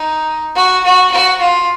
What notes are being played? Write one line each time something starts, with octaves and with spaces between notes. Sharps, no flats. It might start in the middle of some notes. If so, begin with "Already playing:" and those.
Already playing: D#4
F#4
F#4
F#4
F4